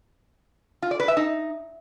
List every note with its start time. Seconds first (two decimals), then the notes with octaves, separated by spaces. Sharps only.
0.82 F4
0.91 D5
1.00 B4
1.08 E5
1.17 D#4